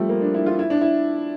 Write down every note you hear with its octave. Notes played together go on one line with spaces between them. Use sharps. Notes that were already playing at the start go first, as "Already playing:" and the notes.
Already playing: F3 G3 A3 C4
A#3
D4
E4
F4
E4
D4
E4